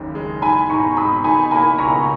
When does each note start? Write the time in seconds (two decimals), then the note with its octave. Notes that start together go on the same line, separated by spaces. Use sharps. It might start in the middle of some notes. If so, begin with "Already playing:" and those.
Already playing: F#1 D#2 C#3
0.15 G#3
0.42 D#3 G#5 B5
0.69 G#2 A#5 C#6
0.97 G#2 B5 D#6
1.24 D#4 G#5 B5
1.51 A#3 G#5 B5
1.78 C#2 A#5 C#6